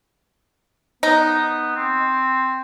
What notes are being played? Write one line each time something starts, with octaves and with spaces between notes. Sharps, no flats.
B3 D#4
C4